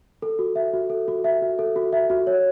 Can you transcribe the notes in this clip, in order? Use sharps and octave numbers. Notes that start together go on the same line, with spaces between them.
A4
F#4
E5
F#4
A4
F#4
E5
F#4
A4
F#4
E5
F#4
C#5